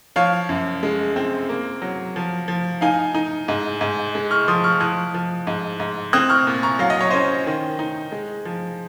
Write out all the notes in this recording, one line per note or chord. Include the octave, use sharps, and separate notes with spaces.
F3 C#5 F5
F#2
G#3
C4
A#3
F#3
F3
F3
D#4 F5 G#5
D#4
G#2
G#2
G#3
C#6 F6
F3 C6 D#6
C#6 F6
F3 D#6 F#6
F3
G#2
G#2
C4 D#6 F#6
C#6 F6
A#2
A#5 C#6
F#3 F5
D#5
C#5
C#4 C5 D#5
D#3
D#4
G#3
F3